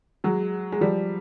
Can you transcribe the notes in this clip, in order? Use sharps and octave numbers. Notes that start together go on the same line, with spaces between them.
F#3 G#3
G#3
F3 G3